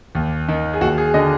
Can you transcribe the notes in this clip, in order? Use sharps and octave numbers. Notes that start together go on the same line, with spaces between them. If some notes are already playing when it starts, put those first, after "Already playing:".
D#2
D#3
G#4
D#2 F#4
G#4
D3 D#5